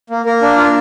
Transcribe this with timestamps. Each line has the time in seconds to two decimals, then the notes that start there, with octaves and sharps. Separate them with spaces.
0.10 A#3
0.26 A#3 A#4
0.42 D4
0.58 F4